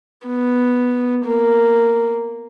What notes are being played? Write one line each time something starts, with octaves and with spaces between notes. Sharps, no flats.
B3
A#3